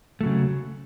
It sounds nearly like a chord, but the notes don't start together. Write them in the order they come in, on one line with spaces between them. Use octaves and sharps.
A3 F#3 C#3